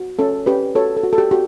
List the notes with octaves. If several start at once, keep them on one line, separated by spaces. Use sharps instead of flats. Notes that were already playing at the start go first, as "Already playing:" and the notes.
Already playing: F#4
C#4 A4
C#4 G4 B4
F#4 A4 C#5
A4
F#4
A4
G4
F#4 G4